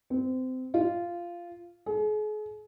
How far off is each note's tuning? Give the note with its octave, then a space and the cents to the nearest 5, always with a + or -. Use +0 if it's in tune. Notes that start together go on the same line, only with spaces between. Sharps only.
C4 -25
F4 -10
G#4 +40